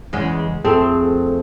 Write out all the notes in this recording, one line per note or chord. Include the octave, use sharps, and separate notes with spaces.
E2 C#3 G#3
F2 A3 C4 G#4